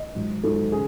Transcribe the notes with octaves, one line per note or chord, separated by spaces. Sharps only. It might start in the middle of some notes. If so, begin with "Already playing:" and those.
Already playing: D#5
G#2 D#3 F#3
G#2 D#3 F#3 A4
C#3 G#4